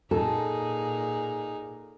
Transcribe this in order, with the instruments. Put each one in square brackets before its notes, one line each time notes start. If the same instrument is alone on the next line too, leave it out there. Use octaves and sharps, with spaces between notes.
[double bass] A#2 [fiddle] D#4 G#4 [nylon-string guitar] A4